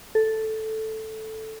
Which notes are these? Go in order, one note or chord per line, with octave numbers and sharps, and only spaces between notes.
A4